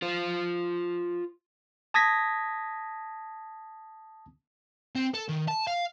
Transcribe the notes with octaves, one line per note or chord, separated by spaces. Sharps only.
F4 C5
A5 D#6 G#6 A#6 B6
C4
A4
D#3
A5
F5